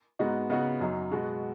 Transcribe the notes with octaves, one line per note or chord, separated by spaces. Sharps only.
G#2 G#3 B3 D#4 F#4
C#3 B3 D#4 F#4
F#2 F#3 D#4
B2 G#3 B3 F#4